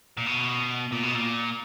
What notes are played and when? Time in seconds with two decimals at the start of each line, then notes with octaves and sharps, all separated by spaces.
0.17 A#2
0.26 B2
0.92 A#2
1.03 B2
1.15 A#2